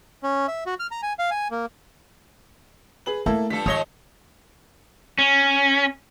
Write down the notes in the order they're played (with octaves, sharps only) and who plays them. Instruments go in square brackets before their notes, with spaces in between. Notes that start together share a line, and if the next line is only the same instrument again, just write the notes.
[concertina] C#4
E5
F#4
F6
A#5
G#5
F5
G#5
A#3
[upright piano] G#4 B4 F#7
[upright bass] A3 [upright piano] A#3 E4 A4
[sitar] G2 F3 A4 [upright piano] B6
[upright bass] D#3 [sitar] F3 G#3 C#5 [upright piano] D#6 A#6 G7
[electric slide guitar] C#4